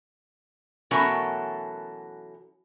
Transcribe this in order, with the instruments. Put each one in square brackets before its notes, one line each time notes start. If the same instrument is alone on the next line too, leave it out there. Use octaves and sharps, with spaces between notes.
[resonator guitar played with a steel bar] B2 E3 F#3 A3 C#4 A#4